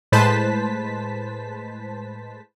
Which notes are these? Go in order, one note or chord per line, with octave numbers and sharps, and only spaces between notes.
A2 G#3 B4 C5 A5 B6